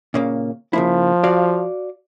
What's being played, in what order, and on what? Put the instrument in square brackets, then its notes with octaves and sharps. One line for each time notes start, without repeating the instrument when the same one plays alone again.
[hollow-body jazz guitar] A#2 C#3 A#3
[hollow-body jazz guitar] C#3 A#3 E4 [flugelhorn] F3
[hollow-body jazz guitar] F#4 D5 F5